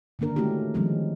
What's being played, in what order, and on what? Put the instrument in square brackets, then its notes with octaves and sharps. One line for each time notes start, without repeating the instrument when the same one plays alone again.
[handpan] D3 D#3 A#3 D4 A#4
G#3 A3 C#4 E4 F#4 G4
D#3 F3 G3 G#3 C4 C#4